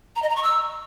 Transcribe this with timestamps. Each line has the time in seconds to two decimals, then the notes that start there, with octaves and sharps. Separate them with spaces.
0.16 A#5
0.23 D#5
0.29 A#5
0.36 C#6
0.43 E6